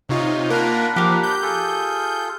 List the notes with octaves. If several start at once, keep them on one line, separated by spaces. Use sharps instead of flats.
C3 D#4 F4 C#5
A#3 D4 F4 A#4 F#5 B5
F3 G4 A#4
G6
F4 G#4 A4